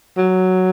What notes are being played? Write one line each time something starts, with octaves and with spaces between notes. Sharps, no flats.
F#3